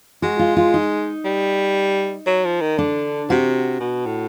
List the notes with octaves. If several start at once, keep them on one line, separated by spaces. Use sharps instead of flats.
G#3 F#4
F4
F4
D#4
G3
F#3
F3
D#3
D3 D4
C3 F#4
B2
A2